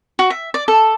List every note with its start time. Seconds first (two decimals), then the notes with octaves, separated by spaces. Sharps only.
0.19 F#4
0.30 E5
0.54 D5
0.68 A4